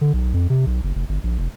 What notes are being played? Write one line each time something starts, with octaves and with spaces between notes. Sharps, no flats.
D3
B1
F2
C3
B1
F#1
F1
G1
A#1
F1